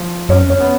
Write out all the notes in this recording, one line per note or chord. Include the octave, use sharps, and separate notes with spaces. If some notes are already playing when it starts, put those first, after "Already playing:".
Already playing: F3
F#2 C#4
C#4
F2
C#4
B3